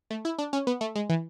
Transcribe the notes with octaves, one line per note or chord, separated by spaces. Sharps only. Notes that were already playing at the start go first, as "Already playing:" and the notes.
A3
E4
D4
C#4
B3
A3
G#3
E3